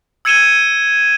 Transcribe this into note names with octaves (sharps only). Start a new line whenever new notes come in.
E6 G#6 C#7 D#7 E7 G7